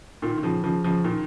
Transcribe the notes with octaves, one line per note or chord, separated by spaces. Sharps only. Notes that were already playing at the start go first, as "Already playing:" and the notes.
A#2 D#3
D#3
C#3 F3
C#3 F3
C#3 F3
A#2 D#3